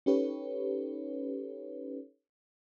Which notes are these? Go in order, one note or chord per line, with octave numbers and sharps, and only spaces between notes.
C#4 D#4 G4 A4 B4 C#5